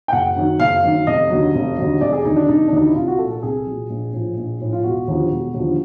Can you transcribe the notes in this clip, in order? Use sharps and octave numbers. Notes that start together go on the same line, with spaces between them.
G5
F#1 F#5
F#2 D#3 F#3
F#1 F5
F#2 D#3 F#3
F1 D#5
D#2 D3 F#3
F1
D#2 D3 F#3
F1 D5
G#4
D#2 D3 F#3 D#4
D4
F1 D#4
D4
D#2 D3 F#3 D#4
E4
C2 F4
F#4
A#2 F#3 A4
A4
C2 G#4
A#2 F#3
A#1
A2 F3
A#1
A2 F3
F4
E1 F#4
D#2 D3 F3
E1
D#2 D3 F3